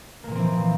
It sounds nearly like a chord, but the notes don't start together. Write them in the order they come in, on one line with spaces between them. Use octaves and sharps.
A#3 A#2 F3 C4 E3